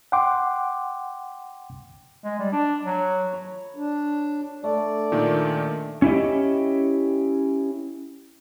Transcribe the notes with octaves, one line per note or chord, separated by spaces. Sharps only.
F#5 G5 C6 D6
G#3
G3
D4
F#3
C#5 B5
D4
A3 D4 D5
A#2 D#3
C#4 E4 G4 D#5